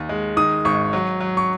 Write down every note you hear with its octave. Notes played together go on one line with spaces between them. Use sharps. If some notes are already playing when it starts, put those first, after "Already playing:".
Already playing: D#2
G#3
D#3 D#6
G#1 C#6
F#3
F#3
C#6